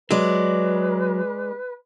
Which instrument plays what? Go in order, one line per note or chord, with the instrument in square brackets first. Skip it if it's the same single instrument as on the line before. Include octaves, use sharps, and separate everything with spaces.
[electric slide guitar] F#3 [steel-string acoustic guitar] G#3 D5 [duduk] B4